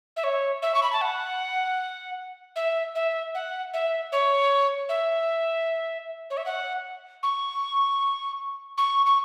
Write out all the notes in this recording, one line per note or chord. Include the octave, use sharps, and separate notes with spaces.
E5
C#5
E5
C#6
B5
A5
F#5
E5
E5
F#5
E5
C#5
E5
C#5
E5
F#5
C#6
C#6
C#6